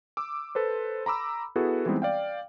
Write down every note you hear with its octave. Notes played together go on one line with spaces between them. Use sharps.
D6 E6
A4 B4 C5
A#5 B5 D6 E6
B3 E4 F#4 G#4 A4 B4
E3 G3 G#3 B3 C4 D#4
D5 F5 G5